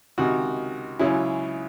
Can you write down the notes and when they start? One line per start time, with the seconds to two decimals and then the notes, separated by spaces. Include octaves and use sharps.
0.18 C#2 C3 D#3 F#4
0.99 C#2 C#3 F#3 C#4 E4